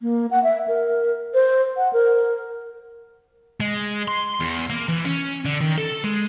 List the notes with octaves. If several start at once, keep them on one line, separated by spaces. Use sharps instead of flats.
A#3
F#5
E5
A#4
C5
F#5
A#4
G#3
C6
E2
A#3
E3
C#4
D3
D#3
A4
G#3